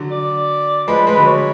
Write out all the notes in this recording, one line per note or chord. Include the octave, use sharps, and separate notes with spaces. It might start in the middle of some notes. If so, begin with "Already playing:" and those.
Already playing: D3 F#3
D5
F3 G#3 B4
G#3 B4
D3 F#3
C#5